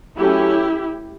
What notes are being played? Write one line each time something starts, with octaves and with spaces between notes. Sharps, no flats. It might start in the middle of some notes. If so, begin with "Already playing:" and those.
F#3 A3 C#4 E4 G4